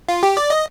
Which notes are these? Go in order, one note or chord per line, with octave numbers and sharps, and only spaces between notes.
F4
G4
D5
D#5